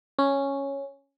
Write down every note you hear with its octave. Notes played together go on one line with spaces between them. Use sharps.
C#4